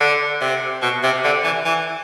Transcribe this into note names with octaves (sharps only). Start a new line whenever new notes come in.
D3
C3
B2
C3
D3
E3
E3